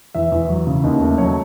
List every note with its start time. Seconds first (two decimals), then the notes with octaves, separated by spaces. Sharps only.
0.15 E2 E5
0.32 E2
0.49 F#3
0.67 C#3
0.84 D#2 D#5
1.01 A3
1.18 F#3 C#5